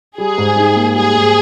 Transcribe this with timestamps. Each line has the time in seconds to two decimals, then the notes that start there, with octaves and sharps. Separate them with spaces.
0.18 G3 G#4
0.38 G#2
0.56 D#4
0.76 A#3
0.95 G3 G#4
1.15 G#2